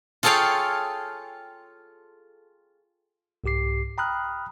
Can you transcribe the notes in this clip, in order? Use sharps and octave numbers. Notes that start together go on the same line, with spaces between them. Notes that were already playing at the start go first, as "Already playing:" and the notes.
F4 G#4 A4 C#5 F5 G5
C2 G#2 G4 D6 C7
G5 A#5 B5 D#6 F6 F#6